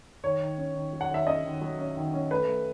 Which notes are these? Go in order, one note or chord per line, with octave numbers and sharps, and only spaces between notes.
D#3 C#5
D#3
C#4
D#3
F#3
F#5
D#3 E5
C#4 D#5
D#3
F#3
C#4
D#3
C#4
A3 B4
A3